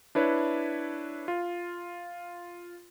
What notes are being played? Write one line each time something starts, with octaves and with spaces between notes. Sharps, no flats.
D4 E4 B4 C#5
F4